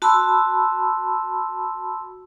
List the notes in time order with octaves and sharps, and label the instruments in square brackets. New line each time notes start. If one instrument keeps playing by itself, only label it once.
[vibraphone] F#4 A5 B5 C6 E6